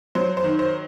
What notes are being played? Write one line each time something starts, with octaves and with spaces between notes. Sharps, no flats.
F#3 C5
C5
D#3
C5